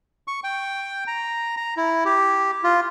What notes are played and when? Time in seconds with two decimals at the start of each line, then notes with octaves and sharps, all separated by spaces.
0.28 C#6
0.44 G5
1.07 A#5
1.57 A#5
1.77 E4
2.05 G4
2.64 F4